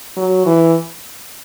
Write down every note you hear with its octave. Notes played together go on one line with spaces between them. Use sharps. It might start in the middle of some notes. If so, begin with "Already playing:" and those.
F#3
E3